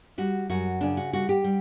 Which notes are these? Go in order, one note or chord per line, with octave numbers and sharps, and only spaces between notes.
G3 F#4
F#2 F#4
C#3 D4
F#4
G3 F#4
G4
G3